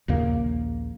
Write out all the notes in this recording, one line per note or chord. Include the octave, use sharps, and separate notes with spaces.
A#1 D#2 C#3 A#3